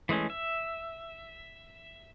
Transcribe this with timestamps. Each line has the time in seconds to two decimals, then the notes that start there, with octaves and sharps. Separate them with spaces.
0.09 E3 G#3 A3 C#4
0.30 E5